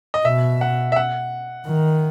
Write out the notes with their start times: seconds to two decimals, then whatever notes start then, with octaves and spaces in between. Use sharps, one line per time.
0.14 D#5
0.25 B2 E5
0.61 F#5
0.92 E5
0.96 F#5
1.67 D#3